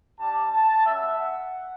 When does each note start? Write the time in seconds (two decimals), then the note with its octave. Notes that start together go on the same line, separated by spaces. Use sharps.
0.20 G3 D4 G4 A5
0.52 A5
0.86 G3 C#4 F#4 E5
1.19 F#5